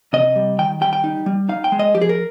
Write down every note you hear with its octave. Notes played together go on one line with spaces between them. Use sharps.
C3 D#5
G3
D#3 G5
G3 G5
G5
D#4
G3
D#4 F5
G5
G#3
D#5
F3 G4
G#4
A#4